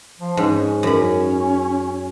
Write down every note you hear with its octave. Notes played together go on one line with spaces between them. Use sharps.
F3
G#2 C#4
F#2 C#4 B5